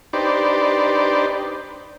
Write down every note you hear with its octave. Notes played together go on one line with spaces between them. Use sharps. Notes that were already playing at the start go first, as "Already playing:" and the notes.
D4 D#4 G4 B4 C5 D5